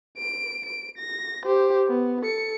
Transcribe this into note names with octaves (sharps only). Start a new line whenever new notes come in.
D7
D7
A#6
G4 C5
B3
A4 C#7